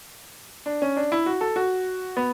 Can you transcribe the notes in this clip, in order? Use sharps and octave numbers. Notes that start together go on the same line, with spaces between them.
D4
C#4
D4
E4
F#4
A4
F#4
B3